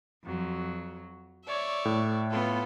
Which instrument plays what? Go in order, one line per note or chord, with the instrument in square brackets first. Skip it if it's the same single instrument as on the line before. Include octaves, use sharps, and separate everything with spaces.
[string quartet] F2 F#3
C#5 D5 E5
[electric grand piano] A2
[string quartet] B3 F4 A4